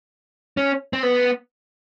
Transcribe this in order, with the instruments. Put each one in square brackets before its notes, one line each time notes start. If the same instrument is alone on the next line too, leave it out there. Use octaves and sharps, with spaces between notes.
[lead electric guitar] C#4
C4
B3